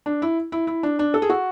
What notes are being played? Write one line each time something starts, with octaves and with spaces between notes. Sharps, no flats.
D4
E4
E4
E4
D4
D4
A4
G#4
F#4